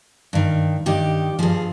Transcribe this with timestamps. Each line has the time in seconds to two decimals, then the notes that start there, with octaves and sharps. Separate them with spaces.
0.33 G2 D#3
0.86 G2 D#3 G4
1.39 G2 F3 G#4